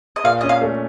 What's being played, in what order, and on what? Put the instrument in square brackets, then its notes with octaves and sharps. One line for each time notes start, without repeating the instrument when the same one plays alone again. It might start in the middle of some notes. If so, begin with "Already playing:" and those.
[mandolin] D#5
[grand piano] A#2 [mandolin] F5
[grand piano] C#4 [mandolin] D#5
[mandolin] F5
[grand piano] A3